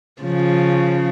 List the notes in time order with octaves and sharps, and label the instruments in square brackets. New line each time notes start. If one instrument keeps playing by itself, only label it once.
[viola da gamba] C#3 F3